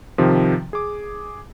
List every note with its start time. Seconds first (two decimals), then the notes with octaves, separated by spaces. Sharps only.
0.18 C3 D#3 F3
0.73 G#4 D6